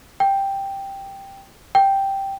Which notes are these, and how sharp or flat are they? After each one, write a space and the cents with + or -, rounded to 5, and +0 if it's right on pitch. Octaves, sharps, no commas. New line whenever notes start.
G5 +5
G5 +0